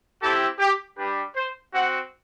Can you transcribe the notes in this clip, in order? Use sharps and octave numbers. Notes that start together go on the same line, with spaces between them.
C4 E4 G4 A4
G4
G3 D4 G4 B4
C5
C4 F#4 F#5